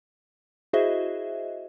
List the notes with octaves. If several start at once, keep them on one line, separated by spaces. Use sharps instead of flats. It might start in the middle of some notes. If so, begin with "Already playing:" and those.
E4 F#4 G#4 C5 D#5 E5